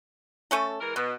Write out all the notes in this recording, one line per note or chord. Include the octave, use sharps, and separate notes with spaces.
A3 C#4 A4
E3 G#3 A#4
B2 B3